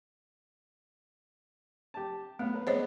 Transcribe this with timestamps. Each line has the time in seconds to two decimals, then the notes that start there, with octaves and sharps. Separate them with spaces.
1.94 G4 A5
2.39 A3 B3 F5
2.54 A#4 B4
2.67 G#3 B3 D4 C5 C#5 D#5